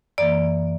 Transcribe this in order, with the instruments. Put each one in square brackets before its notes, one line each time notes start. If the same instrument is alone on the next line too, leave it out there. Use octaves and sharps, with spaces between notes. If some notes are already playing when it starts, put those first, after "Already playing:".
[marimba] F#2 E3 A#3 D5